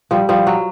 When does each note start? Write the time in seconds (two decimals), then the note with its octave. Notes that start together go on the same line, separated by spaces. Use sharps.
0.11 F3 G3
0.29 F3 G3
0.47 F#3